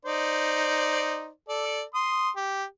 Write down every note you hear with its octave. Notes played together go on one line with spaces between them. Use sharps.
D#4 C5 D5
A4 D5
C6 D#6
G4